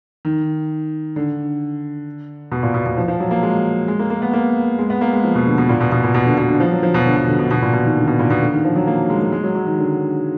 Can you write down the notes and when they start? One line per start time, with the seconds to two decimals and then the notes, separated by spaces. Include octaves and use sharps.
0.25 D#3
1.16 D3
2.52 B2
2.63 A#2
2.74 B2
2.86 B2
2.97 F3
3.08 F3
3.20 F#3
3.31 A#3
3.43 G#3
3.88 G#3
3.99 A#3
4.10 A#3
4.22 B3
4.33 A#3
4.79 G#3
4.90 B3
5.01 A#3
5.13 G#3
5.24 F3
5.35 B2
5.46 D3
5.58 B2
5.69 A#2
5.81 B2
5.92 B2
6.03 A#2
6.15 B2
6.26 D3
6.38 B2
6.49 D3
6.60 F3
6.71 F#3
6.83 F3
6.94 B2
7.06 D3
7.17 B2
7.28 D3
7.39 B2
7.51 B2
7.62 A#2
7.73 B2
7.85 D#3
7.96 D3
8.08 B2
8.19 A#2
8.30 B2
8.42 D3
8.53 D#3
8.64 F3
8.76 F#3
8.87 A#3
9.10 G#3
9.21 A#3
9.32 G#3
9.44 F#3
9.55 F#3
9.67 D#3
9.78 D3